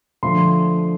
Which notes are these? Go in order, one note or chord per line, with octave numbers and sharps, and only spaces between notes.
D3 F3 A3 C6